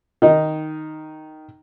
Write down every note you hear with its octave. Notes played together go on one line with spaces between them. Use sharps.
D#3 D#4